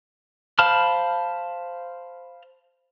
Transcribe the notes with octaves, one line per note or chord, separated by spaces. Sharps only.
C5 F5 A5 B5 F6